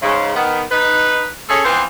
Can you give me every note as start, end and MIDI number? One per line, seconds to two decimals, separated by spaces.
0.02 0.32 44
0.02 0.32 49
0.35 0.62 51
0.35 0.62 59
0.71 1.26 63
0.71 1.26 71
1.49 1.61 61
1.49 1.61 68
1.49 1.61 69
1.64 1.82 52
1.64 1.82 53
1.64 1.82 59
1.64 1.82 60
1.64 1.82 65
1.64 1.82 72